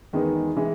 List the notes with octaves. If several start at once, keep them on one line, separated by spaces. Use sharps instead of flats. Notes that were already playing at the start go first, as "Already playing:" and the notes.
E2 D#3 G#3 B3 D#4
E3 G#3 B3